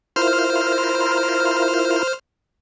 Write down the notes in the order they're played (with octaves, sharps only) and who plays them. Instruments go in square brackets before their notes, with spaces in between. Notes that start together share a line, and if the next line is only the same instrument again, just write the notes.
[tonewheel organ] E4 F4 A#4 [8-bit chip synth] C5 F6